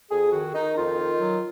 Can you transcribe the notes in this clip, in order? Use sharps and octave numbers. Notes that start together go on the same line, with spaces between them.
F2 G#4
D#3 F#4
D#3 D#4
F2 F4
D#3
F#3